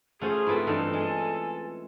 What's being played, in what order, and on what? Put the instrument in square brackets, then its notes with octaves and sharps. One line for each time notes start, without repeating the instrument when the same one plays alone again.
[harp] A3 C#4 C5 [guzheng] F4 F#4 [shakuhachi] G#4
[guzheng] G#2 A3 C4 [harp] E4 F4 B4
[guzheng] G2 E3 F5 [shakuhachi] D#4 [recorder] A4
[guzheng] G#3 [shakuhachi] G#5